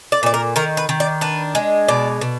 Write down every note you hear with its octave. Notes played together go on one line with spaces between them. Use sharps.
D5
A#2 D5
A#4
D#3 A#4
B4
D#3
D5
D4 B4
G#3
B2 D5
B2